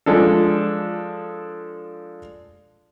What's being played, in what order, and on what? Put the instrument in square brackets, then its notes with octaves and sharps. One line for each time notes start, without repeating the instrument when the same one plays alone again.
[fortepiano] F3 G#3 D4 A4